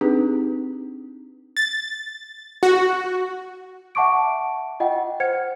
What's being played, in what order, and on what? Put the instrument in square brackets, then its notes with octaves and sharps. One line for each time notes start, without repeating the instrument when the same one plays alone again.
[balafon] C4 D4 D#4 G4 G#4 B4
[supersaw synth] A6
F#4
[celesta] E5 F#5 A5 C#6 D6 D7
F4 D#5 F#5 G5
C5 F#5 G#6 C#7